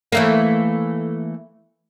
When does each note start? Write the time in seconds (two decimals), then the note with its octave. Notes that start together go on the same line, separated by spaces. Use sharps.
0.12 E3 A3 A#3